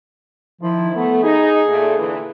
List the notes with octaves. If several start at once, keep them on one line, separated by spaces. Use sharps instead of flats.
D#3 F3 E4
A3 B3
D#4 G#4
A#2 A3
A#2 D3 E3